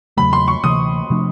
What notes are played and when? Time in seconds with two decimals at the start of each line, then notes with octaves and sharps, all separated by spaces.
0.17 E2 C#3 F#3 A3 B5
0.33 C6
0.48 C#6
0.64 D2 C3 E3 D#6
1.10 C3 F3 A3 D4